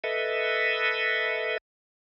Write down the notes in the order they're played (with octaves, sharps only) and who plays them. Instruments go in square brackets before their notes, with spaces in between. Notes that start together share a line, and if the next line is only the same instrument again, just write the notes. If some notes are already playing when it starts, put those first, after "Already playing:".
[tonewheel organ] A4 B4 D#5 E5